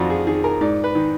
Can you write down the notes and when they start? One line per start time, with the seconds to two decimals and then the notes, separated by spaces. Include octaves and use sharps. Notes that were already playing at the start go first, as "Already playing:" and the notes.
Already playing: F2 D#3 D4 F4 F#4
0.10 G#4
0.27 D#3 G#4
0.44 A#4
0.61 G#2 D5
0.84 B4
0.95 D#3